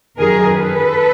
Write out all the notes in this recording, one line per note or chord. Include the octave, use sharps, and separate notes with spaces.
F#2 D#3 G#4 A#4
A4 B4